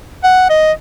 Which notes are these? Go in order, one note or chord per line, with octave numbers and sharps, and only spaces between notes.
F#5
D#5